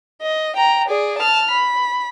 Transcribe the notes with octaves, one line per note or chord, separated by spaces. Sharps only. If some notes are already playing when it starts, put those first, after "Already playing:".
D#5
G5 A#5
G#4 D5
A5 F6
B5